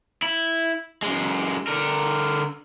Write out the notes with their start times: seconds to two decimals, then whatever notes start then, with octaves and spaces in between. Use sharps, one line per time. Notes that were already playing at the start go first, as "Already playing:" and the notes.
0.22 E4
1.02 F#2 G#3
1.67 D3 A#4